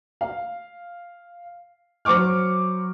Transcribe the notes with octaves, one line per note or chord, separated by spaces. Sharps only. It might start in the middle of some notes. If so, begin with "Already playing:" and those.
F5
F#3 C5 C#6 D6 F6